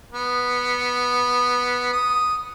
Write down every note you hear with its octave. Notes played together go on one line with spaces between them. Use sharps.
B3
D#6